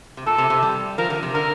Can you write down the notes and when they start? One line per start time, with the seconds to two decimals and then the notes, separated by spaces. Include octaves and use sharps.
0.17 C3
0.26 A#2 A4
0.38 C3
0.50 C3
0.63 G3
0.98 F3 A#4
1.10 D3
1.23 C3
1.34 D3 A#4